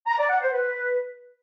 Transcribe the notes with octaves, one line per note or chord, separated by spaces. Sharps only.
A#5
D5
F#5
C5
B4